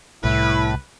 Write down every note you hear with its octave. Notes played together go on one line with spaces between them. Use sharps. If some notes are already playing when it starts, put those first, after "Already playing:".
C2 A2 E4 B4